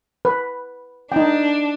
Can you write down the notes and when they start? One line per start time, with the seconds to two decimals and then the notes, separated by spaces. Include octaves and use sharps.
0.25 B4
1.12 D4 D#4 G5